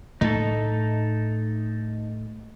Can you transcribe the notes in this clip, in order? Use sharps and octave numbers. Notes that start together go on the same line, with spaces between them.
A2 A3 D#4 A4